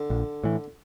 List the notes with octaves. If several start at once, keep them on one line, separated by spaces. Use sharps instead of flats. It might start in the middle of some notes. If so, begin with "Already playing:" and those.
Already playing: D3
A#1
A2 E3